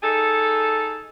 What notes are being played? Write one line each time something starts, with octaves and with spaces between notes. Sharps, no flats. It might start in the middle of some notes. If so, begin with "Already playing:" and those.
D#4 G#4 A4